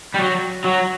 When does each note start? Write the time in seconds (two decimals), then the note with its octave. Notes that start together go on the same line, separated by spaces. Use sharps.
0.15 G3
0.19 F#3
0.64 F#3